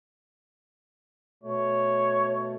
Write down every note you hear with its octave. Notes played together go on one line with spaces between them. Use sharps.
B2 A3 C#5